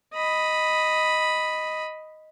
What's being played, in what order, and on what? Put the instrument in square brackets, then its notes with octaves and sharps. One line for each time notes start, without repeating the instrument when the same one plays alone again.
[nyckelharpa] D#5 B5